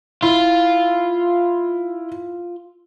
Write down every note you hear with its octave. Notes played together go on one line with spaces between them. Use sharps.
E4 F4